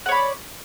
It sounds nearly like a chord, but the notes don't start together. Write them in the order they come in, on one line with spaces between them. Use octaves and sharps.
F#5 C#5 B5 D5